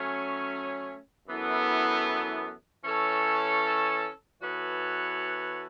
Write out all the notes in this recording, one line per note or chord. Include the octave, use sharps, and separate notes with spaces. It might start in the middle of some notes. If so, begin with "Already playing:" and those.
Already playing: F#3 A3 C#4
F#2 E3 B3 E4 A4
E3 C#4 A4 C#5
E3 B3 F#4 A4 C#5